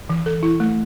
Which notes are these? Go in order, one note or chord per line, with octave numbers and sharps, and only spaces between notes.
E3
A4
E4
A3